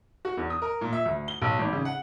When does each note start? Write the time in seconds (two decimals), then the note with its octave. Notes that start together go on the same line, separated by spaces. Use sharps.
0.25 F#4
0.37 E2
0.50 D#6
0.62 A#4
0.81 A#2
0.93 E5
1.05 D2
1.28 G7
1.42 B1
1.59 G#1
1.73 C#3
1.85 F#5